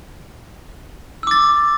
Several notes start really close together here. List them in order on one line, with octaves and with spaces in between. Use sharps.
E6 D6 A6